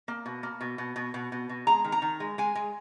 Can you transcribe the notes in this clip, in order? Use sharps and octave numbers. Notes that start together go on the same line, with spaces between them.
A#3
B2
A#3
B2
B2
B2
B2
B2
B2
G#3 A#5
D#3
A#5
D#3
G#3
G#3 G#5
G#3